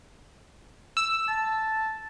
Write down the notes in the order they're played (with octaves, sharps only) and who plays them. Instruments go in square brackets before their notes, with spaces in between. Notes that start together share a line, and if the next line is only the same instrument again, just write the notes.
[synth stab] E6
[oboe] A5